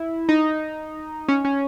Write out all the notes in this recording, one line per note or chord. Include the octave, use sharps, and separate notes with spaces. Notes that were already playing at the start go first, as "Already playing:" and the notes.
Already playing: E4
D#4
C#4
C#4